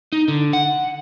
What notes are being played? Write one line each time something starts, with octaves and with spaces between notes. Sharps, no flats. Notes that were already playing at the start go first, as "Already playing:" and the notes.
D#4
D3
F#5